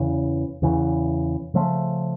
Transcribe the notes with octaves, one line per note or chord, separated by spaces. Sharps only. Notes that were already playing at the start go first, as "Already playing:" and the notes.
Already playing: E2 C#3 E3
E2 C#3 E3
C#3 F3 A3